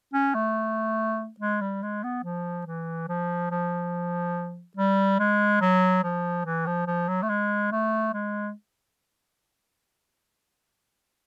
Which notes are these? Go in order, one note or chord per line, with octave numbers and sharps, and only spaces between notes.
C#4
A3
G#3
G3
G#3
B3
F3
E3
F3
F3
G3
G#3
F#3
F3
E3
F3
F3
F#3
A3
G#3
A3
G#3